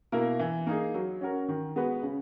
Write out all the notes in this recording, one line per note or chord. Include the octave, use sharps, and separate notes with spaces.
B2 A#3 E4 A#4
E3
A#3 D#4 G#4
F#3
C#4 F#4 A#4
D#3
G#3 B3 F#4 B4
C#3